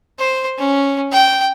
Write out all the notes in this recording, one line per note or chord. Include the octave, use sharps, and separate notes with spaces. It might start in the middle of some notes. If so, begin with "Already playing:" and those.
C5
C#4
G5